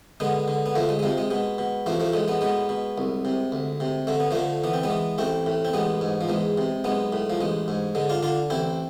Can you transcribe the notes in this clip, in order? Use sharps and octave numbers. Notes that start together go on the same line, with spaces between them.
D3 G#3 B3
D3
B3
D2 F3 A3
G#3
G#3
C3 F3
G#3
B2 G#3
B2
A1 F3 A3
F3 A3
A2 G#3
G#3 B3
B2 G#3 B3
B2
C2
C3
D2
C3
D3 A3
B3
D3 F3 A3
E3 B3
C4
G#3 B3
E3
A1 A3 C4
A2
C4
A1 G#3 B3
G#2
F3
E2 G#3
C3
B1 G#3 B3
A2
F3
A1 G#3
G#2
D3 G#3
D4 F4
D3 D4 F4
A1 C4 E4